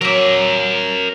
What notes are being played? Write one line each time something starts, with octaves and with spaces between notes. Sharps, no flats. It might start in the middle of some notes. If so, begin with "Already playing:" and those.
F#3 A#3 A#4 E5